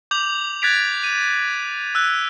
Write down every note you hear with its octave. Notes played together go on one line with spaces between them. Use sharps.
D6 G6 F7 F#7
F#6 G#6 A6 B6 D7 F7
D#7
E6 F#6